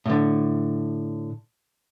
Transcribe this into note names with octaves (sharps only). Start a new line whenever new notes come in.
A2 D3